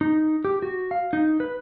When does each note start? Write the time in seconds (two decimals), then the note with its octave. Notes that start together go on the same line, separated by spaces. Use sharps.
0.01 D#4
0.45 G4
0.62 F#4
0.91 F5
1.13 D#4
1.40 B4